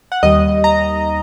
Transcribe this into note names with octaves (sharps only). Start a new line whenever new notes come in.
F#5
D#2 D#3 G3 D#5
A#5